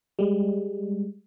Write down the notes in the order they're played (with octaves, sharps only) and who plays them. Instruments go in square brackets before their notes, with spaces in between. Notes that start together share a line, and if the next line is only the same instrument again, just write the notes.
[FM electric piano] G3 G#3